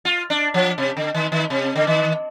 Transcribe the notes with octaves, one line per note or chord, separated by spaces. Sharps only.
F4
D4
F3
C3
D3
D#3
D#3
C3
D3
D#3